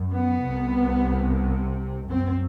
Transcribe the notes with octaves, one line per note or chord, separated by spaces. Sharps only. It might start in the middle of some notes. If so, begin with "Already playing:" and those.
Already playing: F#2
B3
C2 C3
F#2 C4